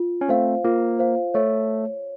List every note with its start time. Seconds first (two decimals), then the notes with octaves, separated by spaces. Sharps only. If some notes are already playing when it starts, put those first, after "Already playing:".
Already playing: F4
0.21 C#4
0.29 A3 C4 C5 F5
0.64 A#3 F4
0.99 C5 F5
1.34 A3 C#5